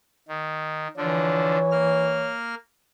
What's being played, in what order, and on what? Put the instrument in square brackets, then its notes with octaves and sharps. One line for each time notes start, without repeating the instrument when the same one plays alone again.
[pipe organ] D#3
[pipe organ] D3 F3 D4 [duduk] E3 [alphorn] C#5
[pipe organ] A#3 F6